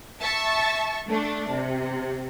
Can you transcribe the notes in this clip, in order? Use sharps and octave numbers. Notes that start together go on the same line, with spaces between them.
E5 A5 C#6
A3 D4
C3